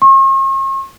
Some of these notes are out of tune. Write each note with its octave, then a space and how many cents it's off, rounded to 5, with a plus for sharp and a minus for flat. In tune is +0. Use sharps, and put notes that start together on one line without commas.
C#6 -45